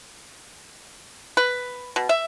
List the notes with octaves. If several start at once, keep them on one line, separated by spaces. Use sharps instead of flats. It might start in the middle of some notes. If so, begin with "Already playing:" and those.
B4
B2
E5